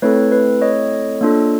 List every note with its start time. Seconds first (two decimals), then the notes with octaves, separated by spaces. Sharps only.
0.02 A3 C4 E4 A4 B4 C#5
0.32 B4
0.61 C#5 D#5
1.21 A#3 D4 F4 A4